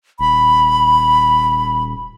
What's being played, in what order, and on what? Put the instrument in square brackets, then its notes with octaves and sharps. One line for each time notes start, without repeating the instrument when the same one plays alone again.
[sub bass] D#1 [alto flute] B5